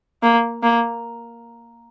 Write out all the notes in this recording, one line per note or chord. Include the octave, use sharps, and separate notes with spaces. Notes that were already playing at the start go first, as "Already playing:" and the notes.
A#3
A#3